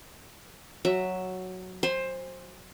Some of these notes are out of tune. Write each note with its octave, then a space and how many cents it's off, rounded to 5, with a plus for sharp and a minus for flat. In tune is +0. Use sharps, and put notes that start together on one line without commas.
F#3 +0 E5 +0 A#5 -15
C5 +15 G#5 -35 C6 -40